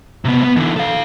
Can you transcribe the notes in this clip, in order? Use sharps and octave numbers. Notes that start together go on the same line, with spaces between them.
C3 B3
B3
D3 E3
A4 F5